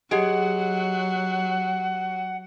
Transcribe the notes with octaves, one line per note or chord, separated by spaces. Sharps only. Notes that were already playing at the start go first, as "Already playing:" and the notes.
F#3 G4 G#4 D#5 F#5 D7